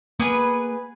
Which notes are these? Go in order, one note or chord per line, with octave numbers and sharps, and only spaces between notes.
A#3 B3 G#4 B4